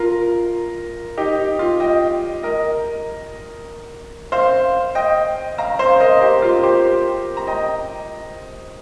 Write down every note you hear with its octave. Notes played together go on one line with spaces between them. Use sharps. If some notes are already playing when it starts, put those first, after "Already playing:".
Already playing: F4 A#4
D#4 G4
D#4
F4
D#5 G5
A#4 D#5
C5 F5
D#5 G5
F5 A#5
C5 F5
A#4 D#5
G4 C5
F4 A#4
G4 C5
A#5
D#5 G5